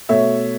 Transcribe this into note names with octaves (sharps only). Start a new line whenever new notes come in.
B2 A3 C#5 E5